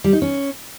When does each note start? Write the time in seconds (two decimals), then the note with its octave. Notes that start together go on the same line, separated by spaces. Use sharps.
0.04 G3
0.13 D#4
0.22 C#4